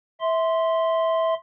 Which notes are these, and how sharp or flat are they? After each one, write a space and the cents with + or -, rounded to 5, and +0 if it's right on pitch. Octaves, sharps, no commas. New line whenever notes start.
E5 -15 C6 -5